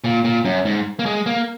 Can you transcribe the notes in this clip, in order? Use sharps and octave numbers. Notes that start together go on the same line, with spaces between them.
A#2
A#2
F#2
G#2
A#3
G#3
A#3